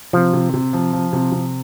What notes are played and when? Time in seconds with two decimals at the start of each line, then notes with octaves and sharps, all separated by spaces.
0.13 C3 F3
0.33 C3
0.54 C3
0.73 F3
0.93 F3
1.13 C3
1.32 C3